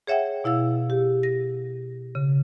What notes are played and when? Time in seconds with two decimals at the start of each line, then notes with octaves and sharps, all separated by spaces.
0.07 G#4 C#5 E5 F#5 G5
0.44 B2 E4 F5 E6
0.90 G4
1.23 A#6
2.15 C#3